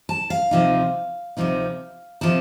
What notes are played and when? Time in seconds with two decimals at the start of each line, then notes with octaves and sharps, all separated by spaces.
0.09 A5
0.30 F5
0.51 D2 C3 F3 C4 D#4
1.37 D2 C3 F3 C4 D#4
2.21 C3 F3 C4 D#4 A5